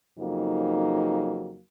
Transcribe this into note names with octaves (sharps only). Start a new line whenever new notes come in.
F2 C#3 F#3 A#3 D#4